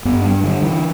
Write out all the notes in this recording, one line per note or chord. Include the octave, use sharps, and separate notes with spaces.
G2 B3
G3
D3 G3
E3